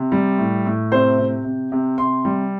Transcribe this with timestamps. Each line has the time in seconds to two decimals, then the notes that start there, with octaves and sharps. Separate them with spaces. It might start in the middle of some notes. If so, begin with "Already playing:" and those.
Already playing: C3
0.12 G3
0.38 A2
0.66 A2
0.92 C3 C5
1.19 C3
1.45 C3
1.72 C3
1.98 C3 C6
2.25 G3